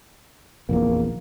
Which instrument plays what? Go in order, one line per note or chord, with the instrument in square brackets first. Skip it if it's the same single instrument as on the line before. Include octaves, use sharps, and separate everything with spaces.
[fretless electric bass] F1 A#1 E2 [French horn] A#3